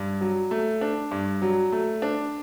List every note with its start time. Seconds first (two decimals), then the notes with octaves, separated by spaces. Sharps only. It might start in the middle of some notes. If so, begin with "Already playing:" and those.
Already playing: G2
0.21 F#3
0.51 A3
0.81 D4
1.11 G2
1.42 F#3
1.72 A3
2.02 D4